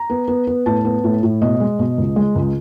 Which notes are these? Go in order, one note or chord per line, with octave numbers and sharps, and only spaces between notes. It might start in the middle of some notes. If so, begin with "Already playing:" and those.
Already playing: A#5
B3
B3
B3
A2 A5
B3
A2
A2
B2 D#5
G#3
B2
C#2
G#3
C#2